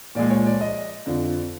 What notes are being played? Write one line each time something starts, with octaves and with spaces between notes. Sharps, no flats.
A#2 F3 G#3 D5
C#5
D5
D#5
F2 D3 F3